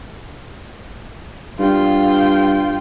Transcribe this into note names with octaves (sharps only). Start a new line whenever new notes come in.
G2 F4 G5